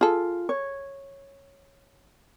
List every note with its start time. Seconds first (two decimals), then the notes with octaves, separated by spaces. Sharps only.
0.01 F4 G#4 A4
0.49 C#5